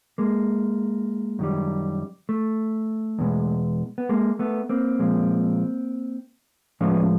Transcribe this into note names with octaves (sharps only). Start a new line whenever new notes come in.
G#3 A#3
F#2 D#3 G3
A3
E2 B2 G#3
B3
G#3 A#3
A3 B3
A#3 C4
A#2 F3 G#3
A2 F3 G#3 B3 C#4